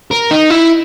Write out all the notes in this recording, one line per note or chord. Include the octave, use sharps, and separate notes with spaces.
A#4
D#4
E4